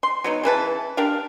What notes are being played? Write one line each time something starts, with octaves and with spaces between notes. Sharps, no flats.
C6
F#3 B3 D#4
C#3 E3 B4 A5
D4 G4 A#4 F5